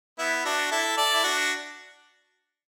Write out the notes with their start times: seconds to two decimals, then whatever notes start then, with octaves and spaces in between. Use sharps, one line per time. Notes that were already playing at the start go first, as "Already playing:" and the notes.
0.19 B3 E4
0.45 D4 F#4
0.71 E4 A4
0.97 A4 D5
1.13 E4
1.24 D4 F#4